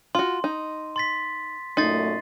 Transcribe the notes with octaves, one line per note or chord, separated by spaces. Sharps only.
F4 F#4 C6
D#4
C6 A6 B6
F#2 A#2 A3 D#4 C6 A6 C7